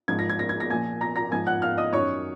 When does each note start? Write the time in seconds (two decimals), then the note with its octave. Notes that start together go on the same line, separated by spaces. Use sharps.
0.08 G#2 F3 G#6
0.19 A#6
0.29 G#6
0.39 A#6
0.49 G#6
0.60 A#6
0.70 A#2 F3 G#5 G#6
1.01 A#5 A#6
1.16 A#5 A#6
1.31 G#2 F3 G#5 G#6
1.47 F#5 F#6
1.62 F5 F6
1.77 D#5 D#6
1.93 F#2 D#3 C#5 C#6